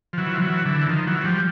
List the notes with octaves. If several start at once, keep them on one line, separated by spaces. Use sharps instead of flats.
F3
E3 F#3
F3
E3 F#3
D3 E3
D#3 F3
E3 F#3
F#3
F3 G3